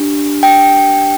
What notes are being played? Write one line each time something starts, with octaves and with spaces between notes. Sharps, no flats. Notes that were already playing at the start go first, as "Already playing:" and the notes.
Already playing: D4 G4
G5